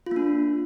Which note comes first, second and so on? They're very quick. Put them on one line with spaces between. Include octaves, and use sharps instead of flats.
F4 A#3 D4